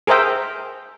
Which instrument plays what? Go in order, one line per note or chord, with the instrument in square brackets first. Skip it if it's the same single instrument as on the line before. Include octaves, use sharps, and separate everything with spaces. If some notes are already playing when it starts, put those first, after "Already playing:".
[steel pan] G#4 A#4 C5 E5 G5